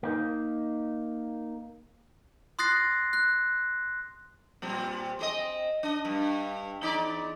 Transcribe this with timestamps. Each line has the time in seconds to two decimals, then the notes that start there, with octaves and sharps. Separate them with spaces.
0.03 A#3 D#4
2.59 C6 D#6 F#6 A6 A#6 C7
3.13 F#6
4.62 A#2 G3 C4
5.19 C4 G#4 D#5
5.83 D4 D#5
6.05 G2
6.82 E2 D#4 D5